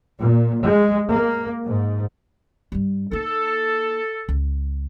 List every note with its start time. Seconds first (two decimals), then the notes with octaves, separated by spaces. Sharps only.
0.17 A#2
0.63 G#3
1.10 A#3
1.64 G#2
2.72 G2 G3
3.11 A#3 D#4 A4
4.29 C#2